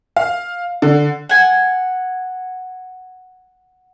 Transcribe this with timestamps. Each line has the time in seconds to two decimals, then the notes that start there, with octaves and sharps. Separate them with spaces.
0.17 F5
0.82 D3
1.29 F#5 G#5